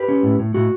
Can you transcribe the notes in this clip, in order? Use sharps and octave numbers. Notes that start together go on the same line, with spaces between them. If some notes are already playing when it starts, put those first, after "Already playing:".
Already playing: G4 B4
C#4
A2
A2
A2 F#4